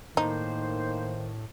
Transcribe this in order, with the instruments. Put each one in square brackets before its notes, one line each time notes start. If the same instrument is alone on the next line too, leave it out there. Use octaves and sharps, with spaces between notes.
[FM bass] A2 [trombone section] D#3 [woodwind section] A#3 C5 [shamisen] D#4